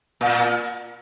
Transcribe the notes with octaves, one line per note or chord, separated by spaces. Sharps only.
A#2